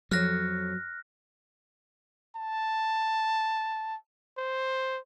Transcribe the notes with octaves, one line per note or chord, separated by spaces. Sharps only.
F2 F#3 C#5 F6 F#6 A#6
A5
C5